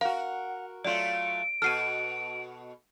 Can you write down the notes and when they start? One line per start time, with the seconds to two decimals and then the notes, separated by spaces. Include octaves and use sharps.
0.01 F#4 A#4 F5 F#5
0.85 F#3 A3 F4 D5 D7
1.62 B2 F#4 A4 F6 C7 D#7